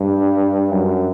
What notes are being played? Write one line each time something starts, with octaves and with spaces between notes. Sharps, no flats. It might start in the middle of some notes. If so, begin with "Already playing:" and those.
Already playing: G2
F#2